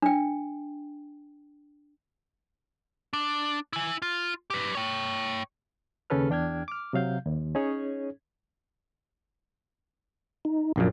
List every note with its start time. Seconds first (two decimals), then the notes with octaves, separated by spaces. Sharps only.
0.02 D4 G5
3.13 D4
3.73 E4 G#5
4.02 F4
4.50 G4 B4
4.75 C#5 G5
6.10 D#2 C#3 C#4 A4 B4 F6
6.30 E2 D4 G5 F6 G#6
6.68 D6 F6
6.93 C3 F#3 F5 G6
7.26 D#2
7.55 C#4 D#4 G#4 C#5
10.45 D#4
10.76 A#1 F#2 A#2